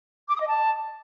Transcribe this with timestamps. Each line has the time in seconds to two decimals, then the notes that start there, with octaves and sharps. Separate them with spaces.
0.27 D6
0.34 D#6
0.40 D#5
0.46 A5